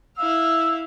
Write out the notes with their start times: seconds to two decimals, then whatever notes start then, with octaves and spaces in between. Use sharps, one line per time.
0.18 E4 F5 E6